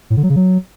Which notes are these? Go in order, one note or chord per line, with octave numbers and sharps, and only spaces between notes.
A2
D3
F#3
C#3
F#3